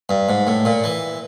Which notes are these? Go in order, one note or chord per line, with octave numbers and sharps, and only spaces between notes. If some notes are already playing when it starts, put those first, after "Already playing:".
G2
G#2
A2
A#2
E3